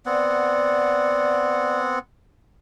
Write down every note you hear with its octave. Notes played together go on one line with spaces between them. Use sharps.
B3 C4 D5 F#5